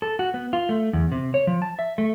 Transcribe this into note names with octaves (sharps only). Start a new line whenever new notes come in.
A4
F#4
B3
F4
A3
E2
C3
C#5
F3
A5
E5
A3